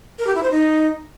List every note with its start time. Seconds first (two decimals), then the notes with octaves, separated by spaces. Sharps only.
0.19 A#4
0.27 G4
0.35 E4
0.43 C5
0.51 D#4